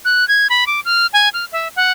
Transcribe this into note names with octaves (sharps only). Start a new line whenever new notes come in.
F#6
G#6
B5
D6
F6
G#5
F6
E5
F#5